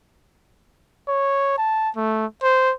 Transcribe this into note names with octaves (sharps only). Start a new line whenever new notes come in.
C#5
A5
A3
C5